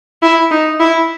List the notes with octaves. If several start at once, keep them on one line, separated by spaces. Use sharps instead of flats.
E4
D#4
E4